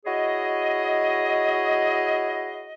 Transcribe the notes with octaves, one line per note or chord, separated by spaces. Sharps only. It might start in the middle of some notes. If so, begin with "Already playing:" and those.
E4 F#4 G#4 C#5 D#5